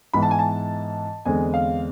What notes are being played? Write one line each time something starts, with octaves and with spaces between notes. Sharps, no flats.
G#2 E3 B3 B5
A5
G#5
A5
E2 D3 G#3 C4 G#5
F5